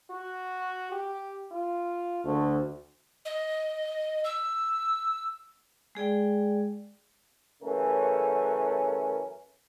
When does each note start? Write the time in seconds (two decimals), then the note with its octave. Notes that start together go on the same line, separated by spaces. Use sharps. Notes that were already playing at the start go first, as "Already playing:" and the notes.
0.10 F#4
0.92 G4
1.52 F4
2.25 D2 A3
3.25 D#5
4.24 E6
5.95 G#3 G#4 D5 G5
7.62 F#2 C#3 E3 A3 C#4 A#4